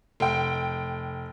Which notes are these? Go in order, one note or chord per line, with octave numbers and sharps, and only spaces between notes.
F1 G5